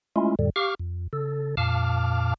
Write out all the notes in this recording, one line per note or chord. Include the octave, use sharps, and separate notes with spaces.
G#3 A3 C#4 E4 F4
F2 A2 D3 G3
G4 F5 C#6 D6 F6
F2
C#3 A4
F2 A#2 F5 A5 D6 F6